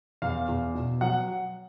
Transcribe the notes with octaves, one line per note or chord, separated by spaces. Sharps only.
E2 F5
E2
B2
F#3 F#5